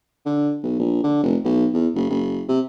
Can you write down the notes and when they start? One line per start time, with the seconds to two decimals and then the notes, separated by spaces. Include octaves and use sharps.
0.26 D3
0.63 B1
0.79 A#1
1.04 D3
1.23 F1
1.45 B1
1.73 E2
1.95 F#1
2.10 F#1
2.48 C3